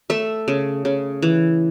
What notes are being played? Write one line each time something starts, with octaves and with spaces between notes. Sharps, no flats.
A3 E5
C#3
C#3
E3